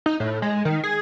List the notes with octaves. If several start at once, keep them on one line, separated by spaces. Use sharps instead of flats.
D#4
A2
G#3
D#3
G#4